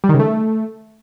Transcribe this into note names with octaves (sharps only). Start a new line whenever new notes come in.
G3
D#3
C#3
A3